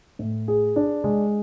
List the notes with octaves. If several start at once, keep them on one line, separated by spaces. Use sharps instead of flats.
A2
G#4
D4
G#3